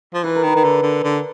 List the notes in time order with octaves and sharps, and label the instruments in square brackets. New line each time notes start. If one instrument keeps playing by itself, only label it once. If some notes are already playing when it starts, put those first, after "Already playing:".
[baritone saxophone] F3
[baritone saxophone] E3 [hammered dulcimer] B4
[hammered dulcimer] A#4
[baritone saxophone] D#3
[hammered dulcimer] B4
[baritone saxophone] D#3
D3
D3
D3